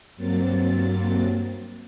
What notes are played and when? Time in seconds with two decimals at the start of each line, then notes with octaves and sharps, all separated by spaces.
0.16 G2 F#3 A#3 C4 A6